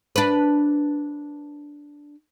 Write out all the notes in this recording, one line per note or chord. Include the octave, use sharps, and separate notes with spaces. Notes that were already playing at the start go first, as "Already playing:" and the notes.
D4 B4